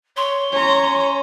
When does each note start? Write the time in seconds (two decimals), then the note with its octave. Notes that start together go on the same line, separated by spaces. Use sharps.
0.17 C#5 C6
0.52 C#4 C#5 A#5